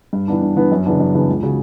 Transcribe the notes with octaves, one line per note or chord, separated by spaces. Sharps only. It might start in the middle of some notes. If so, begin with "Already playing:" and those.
G2
E3 B3 D4
G2
E3 B3 D4
F#2
C#3 E3 B3 D4
F#2
C#3 E3 B3 D4
C#2
C#3 F#3